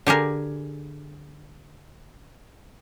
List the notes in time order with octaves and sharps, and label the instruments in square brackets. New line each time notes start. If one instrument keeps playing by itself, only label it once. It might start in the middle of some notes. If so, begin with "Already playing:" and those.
[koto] D3 G4 G#4 A#4